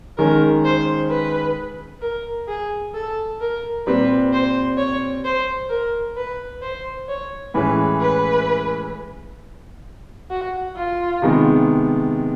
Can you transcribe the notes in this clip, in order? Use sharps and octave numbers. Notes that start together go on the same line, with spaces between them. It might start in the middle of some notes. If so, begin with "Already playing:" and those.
D#3 G#3 C#4 A#4
C5
B4
A#4
G#4
A4
A#4
A#2 G3 C4 B4
C5
C#5
C5
A#4
B4
C5
C#5
A2 E3 G#3 C#4 B4
B4
F#4
F4
C3 D#3 G#3 B3